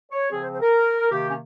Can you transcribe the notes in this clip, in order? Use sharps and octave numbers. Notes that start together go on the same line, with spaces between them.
C#5
C#3 F3 C4 G#4
C5
C5
A#4
C3 D#3 A#3 G4
C#4